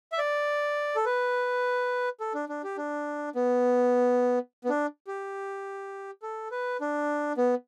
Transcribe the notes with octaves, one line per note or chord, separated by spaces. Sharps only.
E5
D5
A4
B4
A4
D4
D4
G4
D4
B3
B3
D4
G4
A4
B4
D4
B3